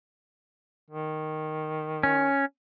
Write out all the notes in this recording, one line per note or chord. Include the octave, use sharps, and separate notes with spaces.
D#3
C#4